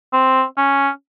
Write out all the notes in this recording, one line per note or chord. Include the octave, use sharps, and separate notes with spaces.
C4
C#4